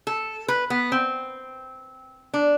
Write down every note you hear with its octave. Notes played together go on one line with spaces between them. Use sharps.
A4
B4
B3
C4
D4